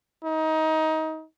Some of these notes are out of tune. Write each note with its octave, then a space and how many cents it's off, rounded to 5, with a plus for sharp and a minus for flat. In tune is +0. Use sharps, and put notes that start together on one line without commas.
D#4 +25